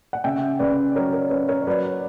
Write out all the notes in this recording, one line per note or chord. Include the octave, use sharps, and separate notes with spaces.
F#5
C#3 E5 G5
C#3 B4 D5
F#3 A#4 C#5
A#4 C#5
C#4 B4
A#4 C#5
C#5
F#3 B4 D5